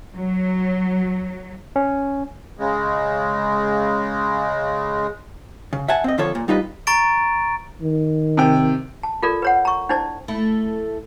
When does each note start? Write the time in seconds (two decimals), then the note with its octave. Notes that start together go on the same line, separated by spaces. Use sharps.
0.16 F#3
1.76 C#4
2.59 C#3 G#3
5.73 C#3
5.88 E5 F#5 G#5 A5
6.04 C4 D#5
6.18 F2 D3 F3 F4 A4 C#5
6.35 A#2
6.48 G3 D#4 F4 B4 D#5
6.87 A#5 C#6 A6 D7
7.81 D#3
8.37 C3 G5
9.03 A5
9.23 F4 A4 A#4 D5
9.42 B4 C#5 F#5
9.65 A#5 C#6
9.89 D4 E4 C5 D5 A5
10.28 A3 E4